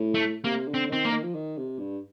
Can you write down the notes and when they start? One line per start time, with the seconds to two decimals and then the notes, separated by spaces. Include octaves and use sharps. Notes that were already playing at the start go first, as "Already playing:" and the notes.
Already playing: A2
0.14 A3
0.44 C3 A#3
0.67 D3
0.74 C4
0.90 D#3 C4
1.05 A#3
1.12 D#3
1.24 F3
1.35 D#3
1.58 C3
1.79 G2